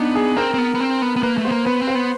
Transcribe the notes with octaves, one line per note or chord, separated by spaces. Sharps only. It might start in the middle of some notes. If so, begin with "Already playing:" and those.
Already playing: B3 D4 D#4
G#4
C4 A#4
C4
B3
B3
C4
B3
B3
A#3 B4
A3
C5
B3
A#3
B3 B4
C4
C5
B3